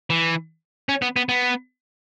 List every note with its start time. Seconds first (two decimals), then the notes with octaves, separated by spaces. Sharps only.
0.10 E3
0.89 C#4
1.02 B3
1.16 B3
1.29 B3